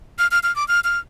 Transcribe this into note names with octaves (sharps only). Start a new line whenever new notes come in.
F6
F6
F6
D6
F6
F6